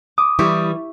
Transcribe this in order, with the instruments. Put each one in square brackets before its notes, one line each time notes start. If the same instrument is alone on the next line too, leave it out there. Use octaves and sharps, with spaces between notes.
[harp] D6 [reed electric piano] D#6
[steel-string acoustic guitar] E3 G3 [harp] E4 G4 C#6